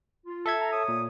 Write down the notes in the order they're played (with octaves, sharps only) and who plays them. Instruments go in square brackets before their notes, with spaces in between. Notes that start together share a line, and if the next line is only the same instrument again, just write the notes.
[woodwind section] F4
[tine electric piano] A4 E5 G#6
[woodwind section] A5 A#5
C#5 D#6
[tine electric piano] A#2